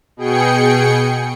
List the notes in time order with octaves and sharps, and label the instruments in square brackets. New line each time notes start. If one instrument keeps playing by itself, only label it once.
[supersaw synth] B2 G#4 G5 C#7